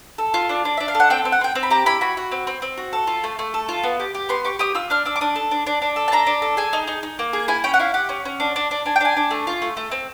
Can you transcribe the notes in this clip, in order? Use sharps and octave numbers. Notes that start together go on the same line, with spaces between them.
A4
F4
D4
D4
D4 E5
F5
A4
F#5
C4 G5
C4
F#5
C4 G5
C4
B5
G4 A#5
E4 B5
F#4 B5
F#4
C4
C4
C4
F#4
A4
F4
A3
A3
A4
F4
B3
G4
G4
B3 C6
G4 C#6
G4 D#6
F4 E6
D4 F6
D4 E6
D6
D4 D#6
A4
D4
D4
D4
A4
A5
D4 A#5
D4
A4
G#4 G#5
D#4
D#4
D#4
A#3
G#4
E4 G#5
C#4 G5
F#5
E4 F5
G4 F#5
C#4
C#4
D4
D4
D4
D4 G#5
G5
D4 G#5
D4
A3
F4
A3
A3
C4